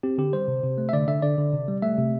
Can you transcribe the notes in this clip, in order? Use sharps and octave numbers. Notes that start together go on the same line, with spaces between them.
C4 G4
D3 G4
G3 C5
C3
C3
A3
E5
D3 D5
D3 E5
D3 D5
D3
C3
G3
A3 E5
C3